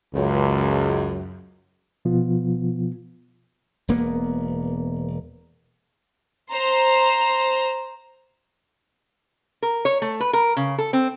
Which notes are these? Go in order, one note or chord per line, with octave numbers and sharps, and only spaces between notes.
C#2 F#2
B2 F3 B3 F4
E1 A#3 B3
C5 A#5
A#4
C#5
A3
B4
A#4
C#3
A4
C4